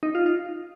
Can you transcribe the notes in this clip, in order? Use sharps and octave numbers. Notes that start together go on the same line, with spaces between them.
D#4
F4
F4